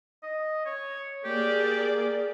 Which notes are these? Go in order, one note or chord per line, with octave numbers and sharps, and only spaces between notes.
D#5
C#5
A#3 G4 G#4 D5